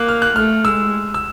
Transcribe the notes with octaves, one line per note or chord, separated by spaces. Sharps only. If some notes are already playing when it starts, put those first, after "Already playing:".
Already playing: A#3 F#6
F6
F#6
A3 F6
G#3 E6
E6